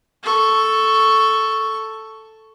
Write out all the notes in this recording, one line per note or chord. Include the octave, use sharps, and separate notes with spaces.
A4 C#6